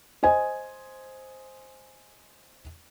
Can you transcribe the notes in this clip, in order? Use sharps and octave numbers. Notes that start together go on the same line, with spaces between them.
C5 D#5 G#5